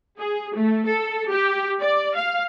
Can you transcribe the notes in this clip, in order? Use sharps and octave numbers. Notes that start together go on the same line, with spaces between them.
G#4
A3
A4
G4
D5
F5